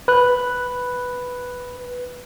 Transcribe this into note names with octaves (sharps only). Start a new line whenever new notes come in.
B4 F#6